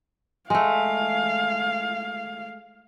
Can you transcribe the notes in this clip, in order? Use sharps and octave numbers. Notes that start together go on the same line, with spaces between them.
G#3 A3 F5